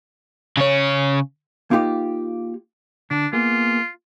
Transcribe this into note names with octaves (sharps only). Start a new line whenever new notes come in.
C#3 C#5
A#3 D#4 F4 G4
D3 D4
A#3 B3 F4 G#4